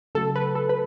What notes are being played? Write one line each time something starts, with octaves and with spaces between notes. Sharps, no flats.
C#3 F#3 A3 F#4 A4
B4
A4
B4